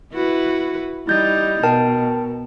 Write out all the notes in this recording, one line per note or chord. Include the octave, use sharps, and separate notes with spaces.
E4 F#4 B4
G3 D#4 E4 G6 A6
B2 A#4 G5 A5